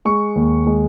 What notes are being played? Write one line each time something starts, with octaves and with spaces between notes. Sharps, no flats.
G#3 C#6
D#2
G#3